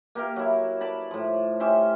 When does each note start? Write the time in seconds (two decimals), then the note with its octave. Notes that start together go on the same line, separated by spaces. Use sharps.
0.15 A#3 G4 A#4 F5
0.36 F#3 E4
0.81 D5 A5 B5
1.11 A2 F3
1.60 C#4 G4 E5 C6